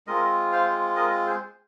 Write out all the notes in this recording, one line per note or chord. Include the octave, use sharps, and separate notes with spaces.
G#3 C4 F4 A#4 D#5
C5 F5
A#4 D#5
G#4 C5